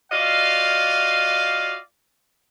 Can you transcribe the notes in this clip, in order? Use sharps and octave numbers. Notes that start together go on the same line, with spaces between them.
F4 F#4 D5 D#5 F5